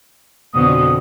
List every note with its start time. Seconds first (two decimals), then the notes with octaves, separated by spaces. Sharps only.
0.54 F2 B2 D3 D#6